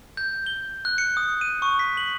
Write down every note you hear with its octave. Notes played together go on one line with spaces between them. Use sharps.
G6
G7
F#6
C#7
D#6
D#7
C#6
B6
F#7